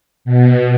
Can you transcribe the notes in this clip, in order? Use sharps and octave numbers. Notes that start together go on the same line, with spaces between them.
B2